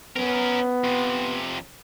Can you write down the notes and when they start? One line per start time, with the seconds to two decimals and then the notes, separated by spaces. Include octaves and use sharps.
0.16 B3 C#4 A#4
0.84 F2 C3